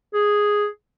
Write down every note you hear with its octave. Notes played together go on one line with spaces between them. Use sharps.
G#4